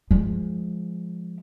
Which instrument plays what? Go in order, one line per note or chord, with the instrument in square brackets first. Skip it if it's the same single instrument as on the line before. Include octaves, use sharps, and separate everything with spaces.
[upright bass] F3 G#3